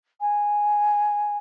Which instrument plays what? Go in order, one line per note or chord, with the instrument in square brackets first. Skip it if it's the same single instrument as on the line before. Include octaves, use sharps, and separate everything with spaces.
[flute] G#5